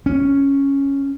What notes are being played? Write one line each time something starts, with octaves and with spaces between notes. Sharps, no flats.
C#4